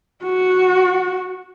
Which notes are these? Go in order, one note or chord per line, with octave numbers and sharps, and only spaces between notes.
F#4